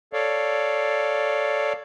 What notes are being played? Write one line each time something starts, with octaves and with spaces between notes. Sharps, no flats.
A4 C#5 D5 F5